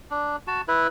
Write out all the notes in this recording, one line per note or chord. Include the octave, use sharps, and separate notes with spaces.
D4
F#4 A5
E4 B4